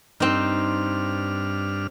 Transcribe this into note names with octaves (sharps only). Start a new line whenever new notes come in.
G2 C4 D4 D#4 F6